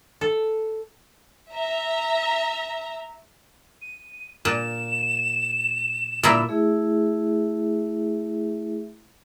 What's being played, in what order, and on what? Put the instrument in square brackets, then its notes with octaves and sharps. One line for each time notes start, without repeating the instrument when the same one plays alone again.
[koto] A4
[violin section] E5 A#5
[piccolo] D#7
[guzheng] A#2 [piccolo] E7
[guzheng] A#2 A#3 E4
[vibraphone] A3 E4 G#4 E5